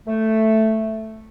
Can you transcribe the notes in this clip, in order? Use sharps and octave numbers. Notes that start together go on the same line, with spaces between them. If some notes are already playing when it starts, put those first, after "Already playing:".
A3